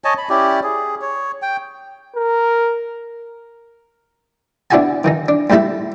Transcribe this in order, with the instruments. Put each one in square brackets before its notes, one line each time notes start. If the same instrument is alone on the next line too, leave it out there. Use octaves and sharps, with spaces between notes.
[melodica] C#5 D#5 G#5 A5
B5
C#4 E4 G4 D5
G#4
C#5
G5
[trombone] A#4
[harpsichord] B3 D4 E4 F#4 G#5 A5
D#3 E3 D#4
D4
G#2 G3 A3 E4 A5 B5